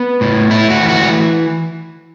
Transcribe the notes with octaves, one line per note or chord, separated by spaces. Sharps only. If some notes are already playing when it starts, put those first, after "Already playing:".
Already playing: B3
A2
A3 E4
F#4
E3
F#4